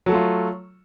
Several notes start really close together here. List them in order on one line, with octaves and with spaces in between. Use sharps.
F#3 A4 A3 F4